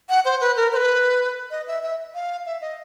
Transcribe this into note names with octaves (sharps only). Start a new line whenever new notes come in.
F#5
C5
B4
A#4
C5
B4
D#5
E5
E5
F5
E5
D#5